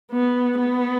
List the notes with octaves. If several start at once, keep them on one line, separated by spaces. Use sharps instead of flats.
B3
B3